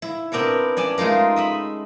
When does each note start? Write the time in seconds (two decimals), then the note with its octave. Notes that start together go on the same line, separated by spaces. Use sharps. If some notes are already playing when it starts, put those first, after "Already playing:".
0.02 E4
0.32 B3 C4 D4 A#4 C#5
0.77 C#4 D5 G#5 A5
0.98 G#3 A3 D#4 F4 A#4
1.36 D#5 E5 B5